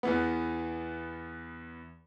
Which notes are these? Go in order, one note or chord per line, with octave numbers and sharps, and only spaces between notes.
E2 E3 B3